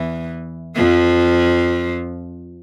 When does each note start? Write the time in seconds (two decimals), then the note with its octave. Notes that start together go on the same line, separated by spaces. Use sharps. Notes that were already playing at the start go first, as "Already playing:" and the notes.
Already playing: E2 E3
0.75 F2 F3